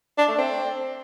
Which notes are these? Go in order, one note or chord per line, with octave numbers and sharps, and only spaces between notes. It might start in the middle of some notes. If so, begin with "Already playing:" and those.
D4
A3
C4